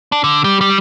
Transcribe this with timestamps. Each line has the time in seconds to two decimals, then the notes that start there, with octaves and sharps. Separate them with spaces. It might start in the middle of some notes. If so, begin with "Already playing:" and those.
0.12 D4
0.24 D3
0.44 G3
0.61 G3